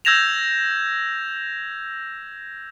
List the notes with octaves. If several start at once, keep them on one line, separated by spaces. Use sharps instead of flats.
E6 G6 G#6 A#6 E7 F7